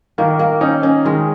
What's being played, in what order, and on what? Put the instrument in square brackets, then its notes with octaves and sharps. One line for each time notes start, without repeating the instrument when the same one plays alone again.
[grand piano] D#3 [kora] A#3
[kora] A#3
[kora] C#4 [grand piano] D#4
[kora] C#4
[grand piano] D#3 [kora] G#3